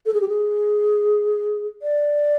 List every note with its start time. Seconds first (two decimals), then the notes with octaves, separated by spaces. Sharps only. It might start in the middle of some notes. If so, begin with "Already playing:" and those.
0.06 A4
0.14 G#4
0.21 G4
0.28 G#4
1.82 D5